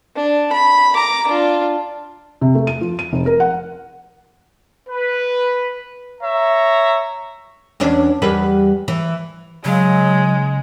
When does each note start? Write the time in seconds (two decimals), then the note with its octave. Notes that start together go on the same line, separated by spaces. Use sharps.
0.16 D4
0.53 B5
0.95 A#5 D6
1.28 D4 F4
2.41 C3
2.55 A3
2.67 D#7
2.81 F3
2.99 D#7
3.13 F1
3.26 A#4
3.40 F#5
4.88 B4
6.21 C#5 E5 A#5
7.80 E2 C#4 D4
8.22 E2 G3 B4
8.88 E3
9.64 C#3 F#3 G#3